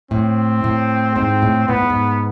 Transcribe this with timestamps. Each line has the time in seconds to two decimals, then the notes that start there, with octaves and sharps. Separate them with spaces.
0.11 A2 C4
0.64 A2
1.16 G#2 C4
1.42 A2
1.68 A2 B3
1.76 G#2
1.90 G#2